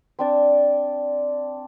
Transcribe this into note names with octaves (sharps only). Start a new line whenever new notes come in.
C4 D4 D5